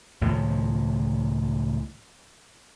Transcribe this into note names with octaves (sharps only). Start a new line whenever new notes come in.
C#2 A2 D#3 F3